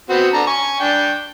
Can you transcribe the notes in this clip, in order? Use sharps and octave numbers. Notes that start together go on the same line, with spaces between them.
B3 C4 F#4
D3 A5 A#5
G#5 C#6
D4 G5